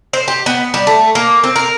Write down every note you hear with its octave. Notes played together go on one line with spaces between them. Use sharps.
C5
G4
B3
G3
A3
A#3
C4
A#4